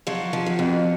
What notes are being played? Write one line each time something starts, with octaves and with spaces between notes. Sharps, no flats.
F3 F#3
F3
F#3
F2